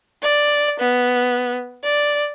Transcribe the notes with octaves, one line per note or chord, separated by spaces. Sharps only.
D5
B3
D5